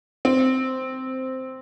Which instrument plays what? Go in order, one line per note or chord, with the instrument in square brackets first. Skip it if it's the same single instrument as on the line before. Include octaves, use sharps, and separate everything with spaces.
[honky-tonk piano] C4